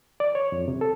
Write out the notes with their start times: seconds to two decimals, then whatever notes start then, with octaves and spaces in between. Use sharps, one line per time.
0.20 D5
0.35 C#5
0.52 F2
0.68 C3
0.81 A4